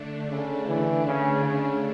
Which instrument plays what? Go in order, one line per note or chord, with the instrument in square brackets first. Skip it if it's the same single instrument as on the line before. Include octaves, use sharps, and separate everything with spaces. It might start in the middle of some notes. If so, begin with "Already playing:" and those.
Already playing: [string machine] D3 A3 D4
[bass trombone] C#3
E3
C#3
C#3